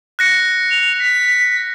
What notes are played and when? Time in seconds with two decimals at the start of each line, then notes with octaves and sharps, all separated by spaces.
0.19 F#6 A#6 C#7
0.71 F7
0.99 B6